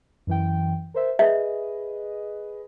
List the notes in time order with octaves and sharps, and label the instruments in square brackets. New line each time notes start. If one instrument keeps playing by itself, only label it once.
[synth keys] F#2 E3 G5
A#4 C5 E5
[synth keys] G#4 B4 D#5 [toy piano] E5